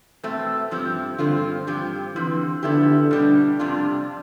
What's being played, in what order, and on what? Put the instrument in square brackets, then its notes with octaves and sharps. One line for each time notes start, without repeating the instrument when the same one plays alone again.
[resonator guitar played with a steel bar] B2 A3 C4
G2 F3 C4 G4
[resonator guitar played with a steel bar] G2 F3 C4 F4 [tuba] D3
[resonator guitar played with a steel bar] G2 F3 C4 G4
[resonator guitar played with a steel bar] D3 F3 C4 [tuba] E3
[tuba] D3 [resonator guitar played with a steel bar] F3 B3 E4 G4
[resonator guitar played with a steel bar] B2 G3 D4 G4
F2 C3 G3 D4 F4